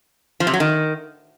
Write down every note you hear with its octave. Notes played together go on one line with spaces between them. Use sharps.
F3
C3
F#3
D#3